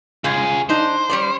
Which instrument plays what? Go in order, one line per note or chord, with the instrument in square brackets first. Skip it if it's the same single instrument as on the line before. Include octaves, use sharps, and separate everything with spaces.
[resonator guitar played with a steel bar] C#3 G#3 [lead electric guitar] F4 G#4
[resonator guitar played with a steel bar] D4 D#4 [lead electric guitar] C5
[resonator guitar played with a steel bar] G3 C#4 D5